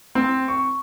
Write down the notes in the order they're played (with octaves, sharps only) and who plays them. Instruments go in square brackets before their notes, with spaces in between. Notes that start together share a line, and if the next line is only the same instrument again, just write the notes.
[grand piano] C4
C#6